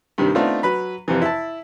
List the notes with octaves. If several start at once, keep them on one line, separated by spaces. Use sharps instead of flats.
G2 C3 D#3 G3
A3 B3 C4 D4 D#4 F4
F#3 B4 B5
F2 C3 E3
E4 A5